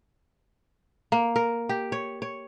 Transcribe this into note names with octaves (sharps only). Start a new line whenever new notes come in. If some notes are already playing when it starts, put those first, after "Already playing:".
A#3
A#4
G4
C#5
C#5